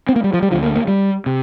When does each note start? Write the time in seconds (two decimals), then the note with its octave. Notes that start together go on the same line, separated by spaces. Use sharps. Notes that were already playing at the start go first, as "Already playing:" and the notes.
0.09 C4
0.16 A#3
0.24 G3
0.34 F3
0.42 G3
0.51 D2 D3 F3
0.63 A#3
0.76 A#3
0.88 G3
1.26 C3